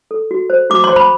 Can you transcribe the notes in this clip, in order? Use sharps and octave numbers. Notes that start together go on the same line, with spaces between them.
A4
F#4
C5
F#4 D6
C6
C5
B5